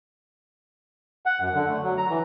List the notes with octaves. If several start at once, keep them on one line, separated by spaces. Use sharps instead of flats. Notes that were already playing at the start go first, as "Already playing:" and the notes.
F#5
F#2
D3
A3
F#3
A#5
E3